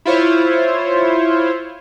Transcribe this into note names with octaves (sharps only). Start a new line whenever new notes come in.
E4 F4 C5 C#5